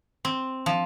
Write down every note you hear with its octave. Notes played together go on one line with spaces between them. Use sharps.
C4
F3